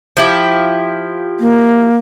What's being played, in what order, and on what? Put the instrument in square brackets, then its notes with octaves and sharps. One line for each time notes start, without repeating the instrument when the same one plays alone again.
[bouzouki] F3 E4 G4
[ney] A#3